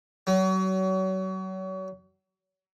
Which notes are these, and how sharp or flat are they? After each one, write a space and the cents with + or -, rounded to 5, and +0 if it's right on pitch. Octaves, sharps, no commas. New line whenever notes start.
F#3 +35